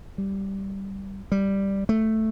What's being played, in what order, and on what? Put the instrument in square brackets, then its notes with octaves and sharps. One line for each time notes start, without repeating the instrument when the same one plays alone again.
[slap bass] G3
G3
A3